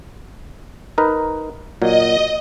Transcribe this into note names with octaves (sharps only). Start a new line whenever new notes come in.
D#4 A#4 B4
A#2 F#3 D#5